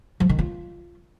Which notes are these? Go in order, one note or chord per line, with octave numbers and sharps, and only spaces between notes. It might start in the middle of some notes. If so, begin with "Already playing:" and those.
F3
D#3
F4